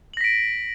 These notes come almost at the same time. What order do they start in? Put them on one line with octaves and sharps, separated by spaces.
F#7 A#6 B6 D7